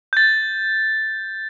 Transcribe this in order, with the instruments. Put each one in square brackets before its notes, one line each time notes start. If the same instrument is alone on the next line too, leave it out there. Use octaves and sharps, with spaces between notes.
[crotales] G6 A6